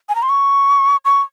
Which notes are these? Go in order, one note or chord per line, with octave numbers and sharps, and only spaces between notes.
G#5
A#5
C6
C#6
C#6